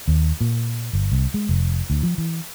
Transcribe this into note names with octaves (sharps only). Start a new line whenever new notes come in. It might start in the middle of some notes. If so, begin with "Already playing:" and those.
D#2
A#2
G1
C2
G#3
F1
D2
F3
E3